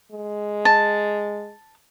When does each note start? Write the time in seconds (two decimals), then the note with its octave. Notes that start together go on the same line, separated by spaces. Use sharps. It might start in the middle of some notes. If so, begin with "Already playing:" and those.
0.12 G#3
0.65 A5